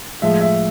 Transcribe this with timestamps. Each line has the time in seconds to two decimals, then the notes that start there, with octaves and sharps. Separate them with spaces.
0.22 A2 F3 G#3 E5
0.41 E5